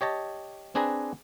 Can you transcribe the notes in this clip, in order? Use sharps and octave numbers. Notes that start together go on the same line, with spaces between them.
G4 C#5 D#5 A5
C4 D4 G#4 B4 G#5 A#5